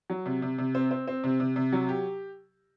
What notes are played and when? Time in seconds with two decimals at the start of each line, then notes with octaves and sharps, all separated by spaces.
0.10 F#3
0.26 C3
0.42 C3
0.58 C3
0.75 C4
0.91 C4
1.08 C4
1.24 C3
1.40 C3
1.56 C3
1.73 F#3
1.89 G4